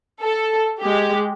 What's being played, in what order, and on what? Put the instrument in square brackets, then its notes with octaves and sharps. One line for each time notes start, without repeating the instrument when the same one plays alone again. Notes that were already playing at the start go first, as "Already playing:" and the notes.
[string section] A4
G#3 G4